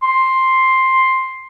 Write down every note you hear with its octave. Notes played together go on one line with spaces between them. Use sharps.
C6